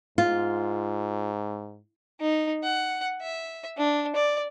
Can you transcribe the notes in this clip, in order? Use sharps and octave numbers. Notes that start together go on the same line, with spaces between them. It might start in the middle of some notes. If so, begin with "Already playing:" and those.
G#2 F4
D#4
F#5
E5
D4
D5